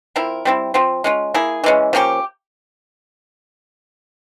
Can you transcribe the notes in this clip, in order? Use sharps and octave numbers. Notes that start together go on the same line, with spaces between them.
F3 C4 E4 A#4
G3 C4 E4
F3 C4 F4
G#3 C#4 F4
A#3 E4 G#4
E3 G#3 C#4
F3 A#3 C#4 G4